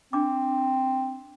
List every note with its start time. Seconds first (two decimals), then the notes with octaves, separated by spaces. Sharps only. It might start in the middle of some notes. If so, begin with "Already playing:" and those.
0.13 C4 D4 D6